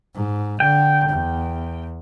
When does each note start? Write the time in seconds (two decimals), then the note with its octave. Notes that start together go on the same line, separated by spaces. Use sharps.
0.15 G#2
0.60 D3 G5
1.09 E2